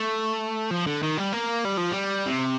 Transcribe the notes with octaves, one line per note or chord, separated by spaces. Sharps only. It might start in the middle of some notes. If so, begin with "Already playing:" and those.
Already playing: A3
F3
D3
D#3
G3
A#3
G3
F3
G3
C3